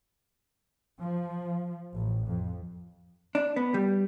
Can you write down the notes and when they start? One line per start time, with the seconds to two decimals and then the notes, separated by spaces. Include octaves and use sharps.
1.00 F3
1.95 A1
2.28 F2
3.35 D4
3.56 B3
3.74 G3